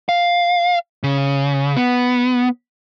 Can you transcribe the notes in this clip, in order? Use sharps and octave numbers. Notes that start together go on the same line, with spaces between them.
F5
C#3
B3